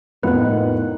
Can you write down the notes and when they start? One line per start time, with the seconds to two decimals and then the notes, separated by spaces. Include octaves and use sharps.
0.23 F1 A2 D#3 A#3 B3 F4 B4 F#5